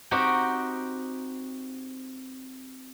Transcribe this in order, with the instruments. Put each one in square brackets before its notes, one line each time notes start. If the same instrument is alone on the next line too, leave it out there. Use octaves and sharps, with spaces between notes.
[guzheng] C4 D#4 F#4 G4 G5 G#5